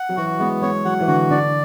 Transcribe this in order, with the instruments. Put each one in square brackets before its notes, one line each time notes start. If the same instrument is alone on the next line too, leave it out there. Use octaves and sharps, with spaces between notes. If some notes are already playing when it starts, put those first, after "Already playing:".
Already playing: [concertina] F#5
[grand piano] F#3
[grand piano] E3 [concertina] F#4
[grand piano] G#3 [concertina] B3
[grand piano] G#3 [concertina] C#5
[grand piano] F#3 [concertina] F#5
[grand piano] E3
[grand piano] D3 [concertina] F#4
[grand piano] D3 [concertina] D5